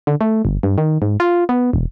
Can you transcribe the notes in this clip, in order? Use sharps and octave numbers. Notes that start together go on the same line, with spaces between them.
D3
A3
G1
G2
D#3
G#2
F4
B3
E1